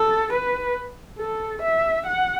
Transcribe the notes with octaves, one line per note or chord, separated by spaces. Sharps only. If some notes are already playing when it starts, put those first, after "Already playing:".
Already playing: A4
B4
A4
E5
F#5